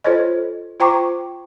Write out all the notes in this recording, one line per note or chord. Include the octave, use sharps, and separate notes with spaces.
F4 A4 C5 C#5 D#5
F4 C5 G5 A#5 C#6 D6